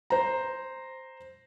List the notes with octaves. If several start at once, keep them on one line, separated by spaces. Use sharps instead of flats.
C5 A#5